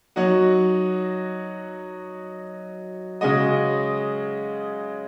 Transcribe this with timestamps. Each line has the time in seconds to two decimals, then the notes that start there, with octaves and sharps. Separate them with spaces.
0.16 F#3 D#4 F#4
3.21 C#3 G#3 F#4 D#5